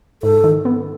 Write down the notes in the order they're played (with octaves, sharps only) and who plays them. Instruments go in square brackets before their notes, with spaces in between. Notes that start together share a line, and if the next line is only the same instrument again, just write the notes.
[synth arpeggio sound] G#2 [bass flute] A4
[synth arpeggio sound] D#3
B3